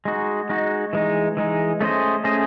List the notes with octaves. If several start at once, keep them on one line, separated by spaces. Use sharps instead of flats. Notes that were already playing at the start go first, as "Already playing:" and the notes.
G#3 D#4 F#4
G#3 D#4 F#4
E3 G#3 D#4
E3 G#3 D#4
A3 C#4 G#4 C5 D#5
A3 C#4 G#4 C5 D#5